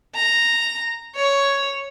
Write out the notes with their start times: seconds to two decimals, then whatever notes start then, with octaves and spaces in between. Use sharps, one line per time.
0.15 A#5
1.15 C#5